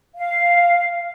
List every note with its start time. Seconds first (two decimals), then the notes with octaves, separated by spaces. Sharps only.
0.16 F5